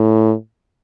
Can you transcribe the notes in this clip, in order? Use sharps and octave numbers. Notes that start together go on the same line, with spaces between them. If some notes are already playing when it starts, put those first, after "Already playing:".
Already playing: A2